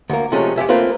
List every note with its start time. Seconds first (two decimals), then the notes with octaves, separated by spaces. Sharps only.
0.10 D2 A#3
0.32 C3 F3 G#3 A3 C#4
0.56 F2 G4 E5 G#5
0.69 A3 A#3 C4 F4 B4